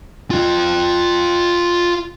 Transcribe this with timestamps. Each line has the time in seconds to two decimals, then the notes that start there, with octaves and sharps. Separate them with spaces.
0.31 F4 G5